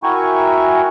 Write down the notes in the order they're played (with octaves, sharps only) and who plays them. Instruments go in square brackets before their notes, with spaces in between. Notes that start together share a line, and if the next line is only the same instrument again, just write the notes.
[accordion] E4 F#4 A#4 G5 G#5 C#6